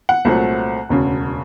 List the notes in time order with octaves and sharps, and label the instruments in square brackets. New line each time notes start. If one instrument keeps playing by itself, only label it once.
[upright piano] F#5
C2 A#2 F#3 A3 C4
E1 D2 C#3